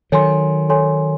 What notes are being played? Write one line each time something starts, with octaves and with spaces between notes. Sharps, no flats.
D#3 F#3 A4 C#5 G#5 C6
A4 C#5 G#5 C6